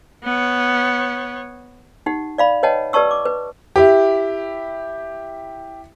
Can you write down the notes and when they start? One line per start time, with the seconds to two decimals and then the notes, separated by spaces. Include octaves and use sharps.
0.24 B3 C#5
2.06 D#4 G4 F#5
2.38 D5 F5 B5
2.63 B4 C#5 D#5 F#5 G5 A5
2.93 G4 B4 D5 A5 C#6 E6
3.11 D6
3.25 B4
3.76 E4 G4